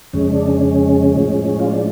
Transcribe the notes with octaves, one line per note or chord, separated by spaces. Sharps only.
F2 C#3 G#3 C#4
D4
C#4
A2 F3 G#3
F4
D4